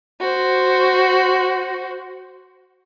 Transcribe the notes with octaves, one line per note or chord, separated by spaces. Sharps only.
F#4 C5